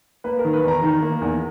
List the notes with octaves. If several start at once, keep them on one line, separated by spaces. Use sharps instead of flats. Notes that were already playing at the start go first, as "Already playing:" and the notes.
A#3 B4
A#4
D#3
B4
E2 A#5
D#3
A#3
E2